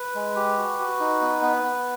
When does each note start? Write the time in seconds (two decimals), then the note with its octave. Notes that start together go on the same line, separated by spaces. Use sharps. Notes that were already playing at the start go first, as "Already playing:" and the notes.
Already playing: B4
0.15 G#3
0.36 G4
0.58 F#4
0.79 F#4
1.00 D#4
1.22 B3
1.42 B3
1.63 B3